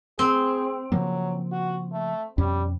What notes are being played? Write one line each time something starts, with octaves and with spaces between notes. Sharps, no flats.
C4 G#4
C#3 F3 F#3 A#3
F#4
A3
F2 B2 G3 C#4